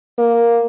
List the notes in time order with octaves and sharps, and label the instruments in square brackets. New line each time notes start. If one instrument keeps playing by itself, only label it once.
[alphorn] A#3